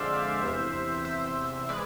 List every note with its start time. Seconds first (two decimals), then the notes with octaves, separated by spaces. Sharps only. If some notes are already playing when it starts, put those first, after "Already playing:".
Already playing: F2 D3 G#3 C5 D5 E5 F5
0.41 E2 C3 E3
1.05 C5 E5
1.69 E3 G#3 B4 D5